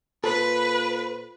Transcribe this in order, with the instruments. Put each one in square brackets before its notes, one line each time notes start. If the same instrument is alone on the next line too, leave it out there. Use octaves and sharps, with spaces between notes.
[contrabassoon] A#2 [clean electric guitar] A4 C5 [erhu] B4